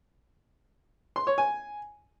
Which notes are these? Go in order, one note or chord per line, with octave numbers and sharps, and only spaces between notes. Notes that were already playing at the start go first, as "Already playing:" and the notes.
C6
C#5
G#5